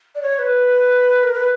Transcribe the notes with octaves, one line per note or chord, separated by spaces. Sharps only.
D5
C#5
B4
A#4
B4